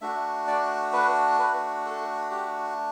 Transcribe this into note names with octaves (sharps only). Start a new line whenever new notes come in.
A3 D4 F#4 E5
D5
B4
B4
A4
G4